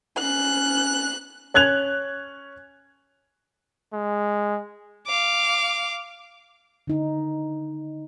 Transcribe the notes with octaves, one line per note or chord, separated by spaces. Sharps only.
C#4 F#6
C#4 F#6 G#6 F7
G#3
F5 D6
D3 D#4